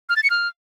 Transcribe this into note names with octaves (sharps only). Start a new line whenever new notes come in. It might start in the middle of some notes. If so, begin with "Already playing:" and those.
F6
A6
C#7
F6